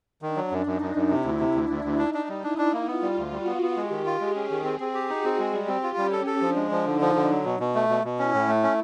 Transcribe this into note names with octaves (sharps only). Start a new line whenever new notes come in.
D#3 D4
F#3
F#2
F#2 D#4
F#2
F#2
C3 E4
D2
C3
D2 D4
D2
D2
D4 D#4
D4
G3
D4 E4
D4
A#3
B3 F4
G3
D2
G3 F#4
B3
B3
G#3 G4
D#3
F4
G#3 G#4
C#4
D#3
C4
C4
G4
D#4 F#4
C4
G#3
G3 G4
C4
F4
G3 C#4
A4
A4
F3 D4
G#3
F3
D3 D#4
F3
D3
F#3
B2
B2
A3
B2
B2
C#4 E4
A2
A3
C#4